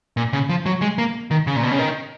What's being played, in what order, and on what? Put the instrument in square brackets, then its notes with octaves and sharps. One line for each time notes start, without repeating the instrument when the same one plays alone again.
[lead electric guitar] A#2
C#3
F3
F#3
G#3
A#3
D#3
C#3
A#2
B2
C#3
D#3